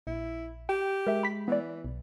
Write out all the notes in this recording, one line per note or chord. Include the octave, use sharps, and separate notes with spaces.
A#1 E4
G4 G5
G#3 A#4 E5
B5 B6
E3 B3 D5
B1